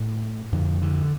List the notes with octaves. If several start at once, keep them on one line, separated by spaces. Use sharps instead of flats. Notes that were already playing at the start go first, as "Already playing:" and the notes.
Already playing: A2
F2 D3
D3